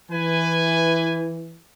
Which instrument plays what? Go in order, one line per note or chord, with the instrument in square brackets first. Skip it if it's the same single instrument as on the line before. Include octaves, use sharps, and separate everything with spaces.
[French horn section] E3 [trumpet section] B4 G#5